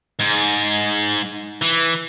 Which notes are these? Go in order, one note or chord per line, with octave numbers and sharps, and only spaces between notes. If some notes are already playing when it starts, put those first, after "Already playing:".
G#2
E3